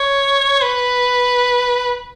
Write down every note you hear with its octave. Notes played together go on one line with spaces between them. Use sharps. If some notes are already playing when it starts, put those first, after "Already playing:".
Already playing: C#5
B4